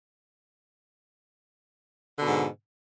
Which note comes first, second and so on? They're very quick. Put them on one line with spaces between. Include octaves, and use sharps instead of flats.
D3 B2 G#2